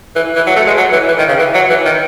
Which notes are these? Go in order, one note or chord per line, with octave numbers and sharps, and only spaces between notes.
E3
E3
F#3
A3
G#3
F#3
E3
E3
D#3
C#3
E3
F#3
E3
D#3